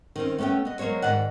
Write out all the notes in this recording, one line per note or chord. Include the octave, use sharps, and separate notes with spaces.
D#3 C4 C#4
A3 B3 C#4 A4 G5
B3 D#5
F#3 G#3 A#3 C5 C#5
G#2 D#3 D5 F#5